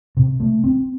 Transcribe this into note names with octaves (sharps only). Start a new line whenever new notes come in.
C3
A3
C4